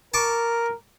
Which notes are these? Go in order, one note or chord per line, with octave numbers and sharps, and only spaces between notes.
A#4 A5 C#6 D6